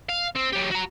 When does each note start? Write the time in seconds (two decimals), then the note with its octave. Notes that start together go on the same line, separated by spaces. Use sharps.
0.09 F5
0.36 C4
0.53 F#3 G4
0.71 F#4 A#5